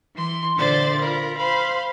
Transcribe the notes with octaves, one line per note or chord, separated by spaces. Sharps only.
E3 C6
A#2 D3 C5 D5 E5 A6
F4 A#4 B5
C5 F5 B5